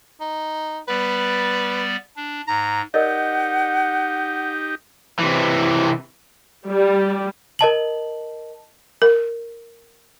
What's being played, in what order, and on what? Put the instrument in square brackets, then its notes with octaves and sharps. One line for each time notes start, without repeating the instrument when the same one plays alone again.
[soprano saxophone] D#4
[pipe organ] G3 B3 D5 [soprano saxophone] B4
[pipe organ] D4
[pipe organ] G#2 [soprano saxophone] A#5
[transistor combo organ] D#4 G4 [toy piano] A#4 D5 D#5 [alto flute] F#5
[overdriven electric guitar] C3 E3
[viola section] G3
[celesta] A#4 D#5 A5 F#7
[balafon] A#4